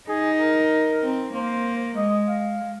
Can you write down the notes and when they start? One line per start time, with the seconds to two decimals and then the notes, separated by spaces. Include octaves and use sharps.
0.08 D#4 G#4
0.40 A#4
1.02 C4
1.33 A#3 C5
1.96 G#3 D#5
2.28 F5